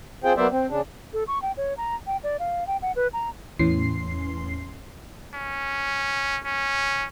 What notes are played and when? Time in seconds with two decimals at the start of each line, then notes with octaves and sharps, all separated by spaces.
0.24 C4 F4 G#4 C5 G5
0.37 F#3 A#3 B3 C5 D5 E5
0.51 C4
0.69 C#3 D4
1.13 A4
1.28 C#6
1.42 G5
1.57 C#5
1.77 A#5
2.07 G5
2.23 D5
2.39 F5
2.67 G5
2.82 F#5
2.96 B4
3.13 A#5
3.59 E2 A2 E3 C#4 C6 C7
5.34 C#4
6.45 C#4